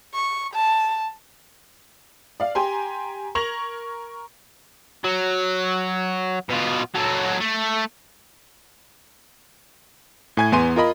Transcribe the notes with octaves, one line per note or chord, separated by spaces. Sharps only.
C#6
A5
D5 F5
G4 G5 G#5 A#5 C6
A#4 C#6 G#6 A#6 F7 F#7
F#3
B2 F4
F#3 A4
A3
A2 G#5 G#6
E2 B3 G#5 C6 D#7
F4 A#4 D#5 B5